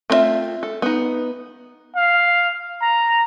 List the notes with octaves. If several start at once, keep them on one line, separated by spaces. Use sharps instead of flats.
A3 C4 D4 F4 E5
A4
B3 D#4
F5
A#5